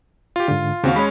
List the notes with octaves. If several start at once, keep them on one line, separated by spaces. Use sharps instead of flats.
F4 G4
G#2 D3 F4
D#2 C#3 C4 F#4 F5
G#3 C#4 C#5 B5